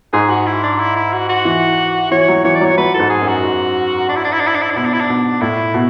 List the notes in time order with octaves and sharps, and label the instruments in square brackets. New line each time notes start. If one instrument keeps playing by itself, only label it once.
[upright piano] G#2 [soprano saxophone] G#4
[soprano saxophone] F#4
E4
D4
E4
E4
F#4
F#4
[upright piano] E3
[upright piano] E3 [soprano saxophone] C#5
[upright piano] F#3
[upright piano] E3 [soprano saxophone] C#5
[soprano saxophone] D5
[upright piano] F#3 [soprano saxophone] C#5
[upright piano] E3
[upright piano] F#3 [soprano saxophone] B4
[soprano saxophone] A4
[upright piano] G#2
[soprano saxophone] G#4
[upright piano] F#2
[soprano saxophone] F#4
[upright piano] G#2
[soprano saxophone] D4
E4
D4
E4
D4
E4
D4
E4
D4
[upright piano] B2 [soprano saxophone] E4
[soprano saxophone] D4
E4
D4
[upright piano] B2
[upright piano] A2 [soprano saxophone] E4
[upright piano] B2